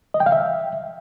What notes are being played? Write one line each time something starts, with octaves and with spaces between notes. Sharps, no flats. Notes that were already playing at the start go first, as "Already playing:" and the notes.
D#5
G5
F5
E5